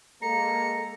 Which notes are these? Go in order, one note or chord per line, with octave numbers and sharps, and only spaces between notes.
G#3 A#3 A4 A#5 C#7